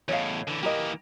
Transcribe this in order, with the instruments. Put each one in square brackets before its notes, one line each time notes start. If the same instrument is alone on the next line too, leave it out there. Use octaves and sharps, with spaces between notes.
[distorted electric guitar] E2 A2 [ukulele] C#5 D#5 F5
[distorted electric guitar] D3 E3
[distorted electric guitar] E3 A#3 [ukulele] G4 A#4 D#5